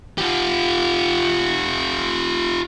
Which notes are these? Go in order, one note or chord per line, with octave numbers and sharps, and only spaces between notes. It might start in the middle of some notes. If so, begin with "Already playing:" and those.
F4 G4